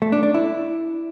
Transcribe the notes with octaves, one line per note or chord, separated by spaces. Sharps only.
A3
D4
D4
E4